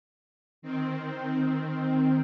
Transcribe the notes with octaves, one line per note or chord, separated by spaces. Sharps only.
D#3 C4